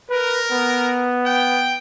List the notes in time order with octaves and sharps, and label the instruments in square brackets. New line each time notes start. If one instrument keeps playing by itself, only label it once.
[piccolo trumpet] A#4 [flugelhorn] B4
[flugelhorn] B3
[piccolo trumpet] G5